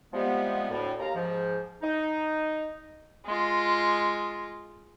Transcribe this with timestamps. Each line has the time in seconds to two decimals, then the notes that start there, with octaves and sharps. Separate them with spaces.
0.13 C3 F3 G3 G#3 B3
0.69 D2 A2
0.99 D#2 F5 A#5
1.15 G#2 F3
1.82 D#4
3.26 G#3 F4